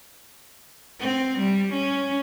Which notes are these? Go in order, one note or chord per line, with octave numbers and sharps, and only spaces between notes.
C4
G3
C#4